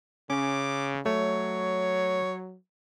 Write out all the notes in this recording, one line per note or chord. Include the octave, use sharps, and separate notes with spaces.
C#3 C#4 D6
F#3 A3 C#5